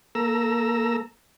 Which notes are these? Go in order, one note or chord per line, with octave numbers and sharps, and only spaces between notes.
A#3 A4 A#5 E6